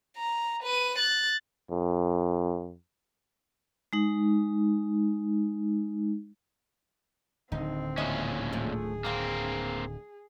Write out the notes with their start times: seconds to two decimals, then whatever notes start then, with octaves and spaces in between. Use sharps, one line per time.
0.17 A#5
0.63 B4 D#7
0.98 F#6 A6
1.71 F2
3.93 G#3 D#4
7.52 D1 D3 D#3 C4 D#4
7.98 A#2 G#3 C#4 E4 D#5 E5
8.52 F3 A3 G#4
9.05 D2 A#3 C4 F5